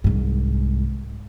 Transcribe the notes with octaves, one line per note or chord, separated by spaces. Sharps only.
C2 G#2